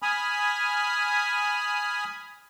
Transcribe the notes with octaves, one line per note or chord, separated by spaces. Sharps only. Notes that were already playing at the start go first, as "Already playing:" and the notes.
G#5 B5 D#6 F6